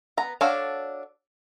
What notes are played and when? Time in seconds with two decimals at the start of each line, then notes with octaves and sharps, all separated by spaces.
0.17 B3 A#5
0.41 D4 F#4 A4 C#5 F5